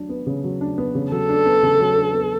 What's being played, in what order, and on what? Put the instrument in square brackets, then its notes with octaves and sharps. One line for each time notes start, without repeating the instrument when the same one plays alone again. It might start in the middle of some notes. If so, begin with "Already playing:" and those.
Already playing: [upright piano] F#3 D4
B3
C#3
F#3
D4
B3
C#3
[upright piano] F#3 [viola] A4
[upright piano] D4
B3
C#3
F#3
D4
B3